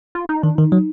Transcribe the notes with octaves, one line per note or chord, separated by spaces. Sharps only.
F4
D#4
D#3 D4
D#3 D#4
F#3